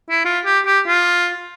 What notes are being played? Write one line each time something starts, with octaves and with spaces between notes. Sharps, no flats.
E4
F4
G4
G4
F4